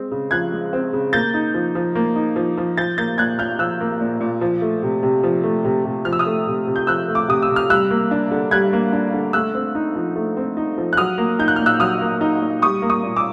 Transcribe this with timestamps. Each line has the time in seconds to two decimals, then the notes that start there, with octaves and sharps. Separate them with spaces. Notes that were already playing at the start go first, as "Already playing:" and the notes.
Already playing: G#3 C4
0.11 C#3
0.31 F3 F#6 G#6
0.52 G#3
0.73 C4
0.93 C#3
1.13 A#3 G6 A6
1.34 D#4
1.54 F3
1.75 F3
1.95 A#3
2.15 D#4
2.36 F3
2.58 F3
2.78 F3 G6 A6
2.98 A#3 G6 A6
3.18 A#2 F#6 G#6
3.39 A#2 F6 G6
3.59 F3 E6 F#6
3.81 A#3
4.01 A#2
4.20 A#2
4.41 F3
4.62 A3
4.83 C3
5.03 C3
5.23 F3
5.44 A3
5.65 C3
5.85 C3
6.05 F3 F6
6.13 E6
6.19 D#6 F6
6.26 A3
6.47 C3
6.67 C3
6.76 G6
6.87 F3 E6 F#6
7.08 A3
7.15 D6
7.28 C3 D#6
7.42 E6
7.49 C3
7.56 F6
7.70 G3 E6 F#6
7.91 A#3
8.11 D4
8.31 D3
8.51 G3 F#6 G#6
8.73 A#3
8.93 D4
9.14 D3
9.33 A3 E6 F#6
9.54 C4
9.75 D#4
9.96 F3
10.15 A3
10.37 C4
10.57 D#4
10.78 F3
10.93 F#6
10.97 F#3 D#6 F6
11.18 A#3
11.39 D#4 G6
11.48 F#6
11.56 A#2 F6
11.66 E6 F#6
11.80 F#3 D#6 F6
12.01 A#3
12.21 D#4
12.42 A#2
12.62 G3 C#6 D#6
12.82 A#3
12.89 C#6 D#6
13.03 A#2
13.16 D6 E6